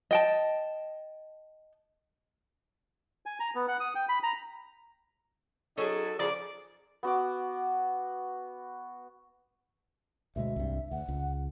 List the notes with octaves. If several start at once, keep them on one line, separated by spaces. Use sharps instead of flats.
D#5 G5 A5
G#5
A#5
B3
F#5
D#6
G5
B5
A#5
F#3 C#4 D#4 G#4 A4
C#3 F3 G#4 A#4 D5 F#5
B3 F#4 F#5 D6
D2 B2 G#3 E5
C2 G2
D2 F#5
C#2